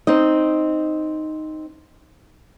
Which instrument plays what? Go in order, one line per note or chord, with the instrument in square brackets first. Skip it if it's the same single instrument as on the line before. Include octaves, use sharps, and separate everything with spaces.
[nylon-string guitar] C4 D#4 D#5